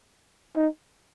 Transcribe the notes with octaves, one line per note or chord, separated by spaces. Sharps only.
D#4